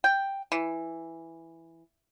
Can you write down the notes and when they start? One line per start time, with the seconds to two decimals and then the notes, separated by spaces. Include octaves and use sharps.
0.04 G5
0.52 E3